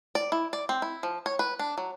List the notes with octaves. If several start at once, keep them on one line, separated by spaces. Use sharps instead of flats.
D5
E4
D5
C4
E4
F3
C#5
B4
D4
F#3